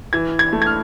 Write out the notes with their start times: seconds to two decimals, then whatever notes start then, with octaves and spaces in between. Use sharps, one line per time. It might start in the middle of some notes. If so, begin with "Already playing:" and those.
0.13 E3 G#6
0.39 G#6
0.53 A3
0.62 G#6
0.66 F6